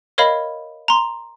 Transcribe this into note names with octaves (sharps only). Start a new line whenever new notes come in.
A#4 C#5 D#5 F5 B5
A#5 C6